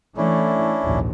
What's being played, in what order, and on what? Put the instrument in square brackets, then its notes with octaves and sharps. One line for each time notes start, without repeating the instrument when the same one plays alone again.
[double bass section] E3 A3 [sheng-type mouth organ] C#4 D4 E4
[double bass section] A#1 D#2 G#2